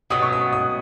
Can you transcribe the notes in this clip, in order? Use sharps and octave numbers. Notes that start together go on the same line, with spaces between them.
B2 F#3 B3 D#6
C#6
D#6
D#6